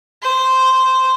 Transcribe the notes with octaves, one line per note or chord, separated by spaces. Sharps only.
C5